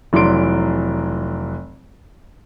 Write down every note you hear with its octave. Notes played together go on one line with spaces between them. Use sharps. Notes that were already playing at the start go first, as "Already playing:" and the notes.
F1 E3 F#3 D5 C6 D7